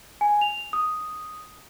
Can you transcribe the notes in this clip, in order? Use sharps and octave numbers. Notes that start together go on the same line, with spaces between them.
G#5
F7
D#6